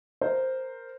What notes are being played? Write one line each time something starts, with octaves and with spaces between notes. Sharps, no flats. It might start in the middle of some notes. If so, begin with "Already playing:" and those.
A#4 C5